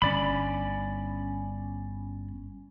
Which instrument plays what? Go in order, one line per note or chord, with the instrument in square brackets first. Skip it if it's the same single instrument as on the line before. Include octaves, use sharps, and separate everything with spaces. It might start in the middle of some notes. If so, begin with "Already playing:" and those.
[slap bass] G1 [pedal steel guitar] C#4 D5 B5